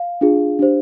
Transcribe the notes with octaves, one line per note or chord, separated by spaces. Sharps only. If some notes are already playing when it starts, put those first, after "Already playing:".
Already playing: F5
D4 F4 G#4
D4 G4 C5